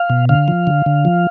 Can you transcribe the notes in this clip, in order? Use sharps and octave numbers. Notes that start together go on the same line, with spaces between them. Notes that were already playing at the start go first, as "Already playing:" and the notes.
Already playing: F5
B2
D3 F5
F3
D3
D3
F3